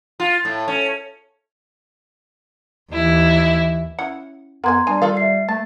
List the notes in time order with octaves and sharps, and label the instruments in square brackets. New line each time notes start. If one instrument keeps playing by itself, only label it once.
[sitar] F4
A2
C#4
[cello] D#2 E3 [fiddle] E4
[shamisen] C#4 E4 [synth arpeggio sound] F#5
[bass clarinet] F2 [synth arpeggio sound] B3 [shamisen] A#4 B4 G#5 [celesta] A#5 C6 G#6
[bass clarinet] G3 [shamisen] D4 [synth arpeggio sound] G#5
[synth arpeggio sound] D#3 [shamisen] F4 A4 F5
[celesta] E5 C7
[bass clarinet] A3 [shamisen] A5 [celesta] A6